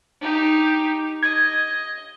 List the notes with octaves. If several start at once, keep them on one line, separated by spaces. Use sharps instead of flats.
D#4 G4
D#5 G#6